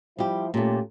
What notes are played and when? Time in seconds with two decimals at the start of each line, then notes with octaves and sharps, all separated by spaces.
0.19 F3 G3 E4 G4
0.54 A#2 A3 C#4 F4 G4